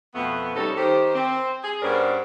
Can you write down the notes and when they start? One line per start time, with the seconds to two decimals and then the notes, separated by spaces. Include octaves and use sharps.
0.15 F2 B2 A3 B3
0.55 C3 G3 C#4 D#4 A4
0.77 D#3 G4 C5
1.15 C4
1.64 G#4
1.82 G2 B3 C#4 A#4 C5 D5